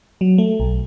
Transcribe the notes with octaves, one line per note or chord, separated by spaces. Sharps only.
F#3
A3
B1